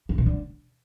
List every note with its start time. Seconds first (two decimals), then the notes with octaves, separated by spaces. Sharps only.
0.09 E3
0.18 C3
0.26 D3